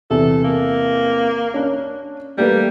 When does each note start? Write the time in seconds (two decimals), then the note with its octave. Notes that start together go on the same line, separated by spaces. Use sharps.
0.11 E2 C3 A4
0.44 A#3
1.54 C#4 D4
2.38 G3 A3 A#3 B4